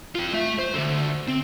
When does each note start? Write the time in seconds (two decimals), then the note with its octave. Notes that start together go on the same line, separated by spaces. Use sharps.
0.15 F4 G5
0.33 A3 E5
0.59 C5
0.74 D2 D3
1.28 C4